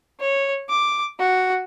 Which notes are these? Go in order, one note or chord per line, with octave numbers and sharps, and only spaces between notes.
C#5
D6
F#4